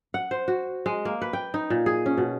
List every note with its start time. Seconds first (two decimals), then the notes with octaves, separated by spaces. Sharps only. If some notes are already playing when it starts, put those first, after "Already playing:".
0.14 F#5
0.31 C5
0.48 F#4
0.86 G#3
1.05 A#3
1.22 B4
1.33 G5
1.54 D#4
1.70 A#2
1.86 G#4
2.06 C#4
2.17 B2